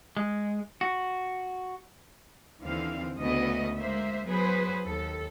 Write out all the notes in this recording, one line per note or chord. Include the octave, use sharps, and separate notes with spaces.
G#3
F#4
D#2 D3 E3 C4 F5
D2 C#3 A3 B3 D#5
G#3 A#3 C5 E5
F#3 B3 G#4 B4 C5
D#2 A4